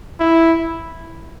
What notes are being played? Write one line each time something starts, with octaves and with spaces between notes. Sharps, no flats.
E4